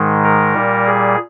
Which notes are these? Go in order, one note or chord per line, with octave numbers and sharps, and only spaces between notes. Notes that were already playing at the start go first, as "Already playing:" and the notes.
Already playing: G#2 D#3 G#3
A#4
A#2 G3
G#4